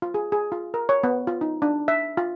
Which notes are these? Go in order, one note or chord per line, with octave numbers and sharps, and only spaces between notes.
F4
G#4
G#4
F4
A#4
C#5
B3
F4
D#4
D4
E5
F4